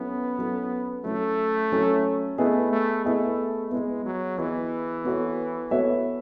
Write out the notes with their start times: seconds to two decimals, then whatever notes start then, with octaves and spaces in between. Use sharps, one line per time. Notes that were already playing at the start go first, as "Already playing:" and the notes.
Already playing: F#3 B3 C#4 E4 A4
0.38 F#3 C#4 E4 A4
1.05 F#3 A3 C#4 E4 A4
1.72 F#3 C#4 E4 A4
2.38 A3 B3 E4 G#4 D#5
2.72 A3
3.05 A3 B3 E4 G#4 D#5
3.71 G#3 B3 E4 G#4 D#5
4.05 F#3
4.38 E3 B3 E4 G#4 D#5
5.05 B3 F#4 A4 C#5 E5
5.71 B3 F#4 A4 C#5 E5